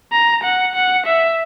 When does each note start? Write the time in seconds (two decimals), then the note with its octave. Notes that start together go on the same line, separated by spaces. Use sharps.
0.13 A#5
0.44 F#5
0.75 F#5
1.06 E5